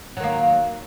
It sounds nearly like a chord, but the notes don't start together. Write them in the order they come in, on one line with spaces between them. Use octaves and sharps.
F#3 D#3 A#3